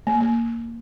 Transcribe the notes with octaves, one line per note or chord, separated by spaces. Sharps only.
A#3
A#3